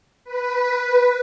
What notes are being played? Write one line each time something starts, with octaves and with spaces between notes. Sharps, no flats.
B4